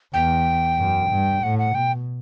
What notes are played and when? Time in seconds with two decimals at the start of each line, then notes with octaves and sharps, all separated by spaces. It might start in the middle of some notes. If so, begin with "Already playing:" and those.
0.13 E2 G5
0.78 F#2
1.10 G2
1.43 A2 F#5
1.59 F#5
1.75 B2 G5